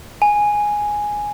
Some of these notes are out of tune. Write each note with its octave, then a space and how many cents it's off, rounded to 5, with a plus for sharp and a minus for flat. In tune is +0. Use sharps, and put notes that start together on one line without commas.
G#5 +0